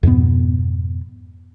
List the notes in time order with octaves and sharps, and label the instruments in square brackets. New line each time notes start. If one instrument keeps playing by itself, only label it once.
[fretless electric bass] F2 G#2 B2 B3